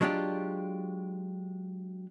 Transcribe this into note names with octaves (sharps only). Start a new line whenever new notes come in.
F#3 G#3 D4 F4 G4